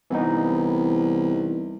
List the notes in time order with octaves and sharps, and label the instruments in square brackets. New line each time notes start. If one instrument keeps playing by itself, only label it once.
[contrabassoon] C2 [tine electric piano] E3 B3 D#4